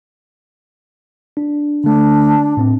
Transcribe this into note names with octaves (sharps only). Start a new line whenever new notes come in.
D4
D3 A3 D4
A2 C4